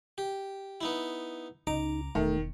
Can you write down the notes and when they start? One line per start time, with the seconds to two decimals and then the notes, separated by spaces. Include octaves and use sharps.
0.18 G4
0.81 B3 D#4 E4
1.67 C#2 D#4 A#5 D6
2.15 E1 D#3 A3